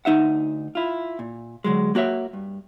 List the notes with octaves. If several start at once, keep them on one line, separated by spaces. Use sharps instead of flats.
D2 D#4 E5 F#5
E4 F4
A#2
D3 F#3 G#3
A#3 F#4 C#5 E5
G2